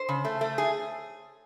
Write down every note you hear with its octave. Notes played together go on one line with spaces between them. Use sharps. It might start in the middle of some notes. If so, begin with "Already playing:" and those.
Already playing: C5
C#3
A3
A3
G#4